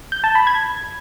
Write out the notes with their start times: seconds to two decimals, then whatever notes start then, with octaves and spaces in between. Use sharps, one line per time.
0.12 G6
0.24 A5
0.35 B5
0.47 G#6